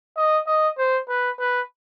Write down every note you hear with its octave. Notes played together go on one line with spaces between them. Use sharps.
D#5
D#5
C5
B4
B4